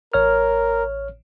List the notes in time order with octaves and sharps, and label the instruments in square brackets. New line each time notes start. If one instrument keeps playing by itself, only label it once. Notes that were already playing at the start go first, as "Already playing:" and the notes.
[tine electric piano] A1 C#5 F6 [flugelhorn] A#4